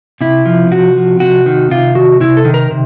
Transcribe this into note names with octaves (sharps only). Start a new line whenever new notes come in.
C3 E4
F3
C3 F#4
F3
C3 F#4
D#3
C3 F4
D#3 F#4
C3 E4
A4
D#3
A#4
C3